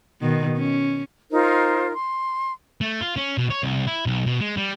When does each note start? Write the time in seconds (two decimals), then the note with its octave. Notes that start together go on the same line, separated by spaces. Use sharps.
0.22 B2 D#3
0.57 C#4
1.32 D#4 F4 A#4 C5
1.94 C6
2.81 A3
3.01 F4
3.17 C#4
3.38 B2
3.50 C#5
3.63 C2
3.87 E4
4.06 B1
4.26 B2
4.41 G#3
4.57 G3